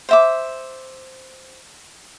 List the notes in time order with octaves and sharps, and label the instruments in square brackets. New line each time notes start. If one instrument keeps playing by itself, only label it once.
[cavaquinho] C5 E5 D6